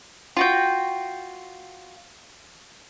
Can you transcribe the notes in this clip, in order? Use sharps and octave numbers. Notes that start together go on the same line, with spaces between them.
F4 F#4 G5